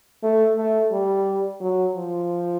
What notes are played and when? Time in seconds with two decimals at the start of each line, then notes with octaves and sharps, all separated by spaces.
0.23 A3
0.57 A3
0.92 G3
1.60 F#3
1.96 F3